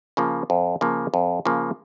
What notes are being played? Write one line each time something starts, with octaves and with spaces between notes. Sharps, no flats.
C#3 F3 A#3
F2
C#3 F3 A#3
F2
C#3 F3 A#3